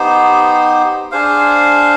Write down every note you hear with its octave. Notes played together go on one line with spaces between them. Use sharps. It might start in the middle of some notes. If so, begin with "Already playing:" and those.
Already playing: B3 D#4 G4 C5
D4 G#4 C5 F5